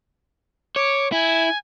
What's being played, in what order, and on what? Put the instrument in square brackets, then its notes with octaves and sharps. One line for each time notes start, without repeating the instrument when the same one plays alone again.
[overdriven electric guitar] C#5 [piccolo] D6
[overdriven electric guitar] E4 [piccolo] G#5